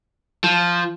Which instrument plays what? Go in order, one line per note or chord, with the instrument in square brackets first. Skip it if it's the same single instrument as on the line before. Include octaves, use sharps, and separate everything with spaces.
[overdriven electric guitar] F3